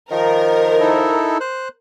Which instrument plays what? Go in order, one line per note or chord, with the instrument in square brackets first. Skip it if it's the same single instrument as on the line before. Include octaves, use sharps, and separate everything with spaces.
[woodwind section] D#3 F3 [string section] A#4
[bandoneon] D#4 E4 A4
C5 F#6